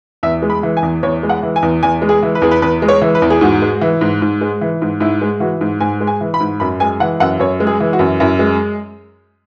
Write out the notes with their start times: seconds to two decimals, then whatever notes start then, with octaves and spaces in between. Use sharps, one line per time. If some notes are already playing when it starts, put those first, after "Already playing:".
0.23 E2 E5
0.42 G#3
0.50 B5
0.63 E3
0.77 G#5
0.83 E2
1.03 E2 C#5
1.23 G#3
1.29 F#5
1.43 E3
1.56 G#5
1.63 E2
1.83 E2 G#5
2.02 G#3
2.09 G#4
2.23 E3
2.35 B4
2.42 E2 G#4
2.51 B4
2.62 E2 B4
2.82 G#3
2.88 C#5
3.02 E3
3.15 B4
3.22 E2
3.30 G#4
3.41 G#2 F#4
3.62 G#3
3.81 E3
4.01 G#2
4.22 G#2
4.41 G#3
4.61 E3
4.82 G#2
5.00 G#2 E4
5.22 G#3
5.40 E3 F#4
5.61 G#2
5.81 G#2 G#5
6.01 G#3
6.07 G#5
6.21 E3
6.34 B5
6.40 G#2
6.60 F#2 B5
6.80 G#3 G#5
7.00 E3 F#5
7.20 F#2 F#5
7.39 F#2 C#5
7.60 G#3
7.67 G#4
7.80 E3
7.93 F#4
7.99 F#2
8.20 F#2 E4
8.39 G#3